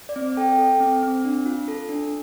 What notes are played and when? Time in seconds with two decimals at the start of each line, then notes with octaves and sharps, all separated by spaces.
0.09 D5
0.16 C4
0.37 A4 G5
0.59 A4
0.80 C4
1.03 C4
1.25 D4
1.46 F4
1.68 A4
1.89 D4